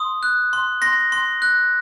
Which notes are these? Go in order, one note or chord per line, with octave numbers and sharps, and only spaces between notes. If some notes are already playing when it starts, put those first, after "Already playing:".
Already playing: C6 D#6
F#6
C6
C6 A#6
C6
F#6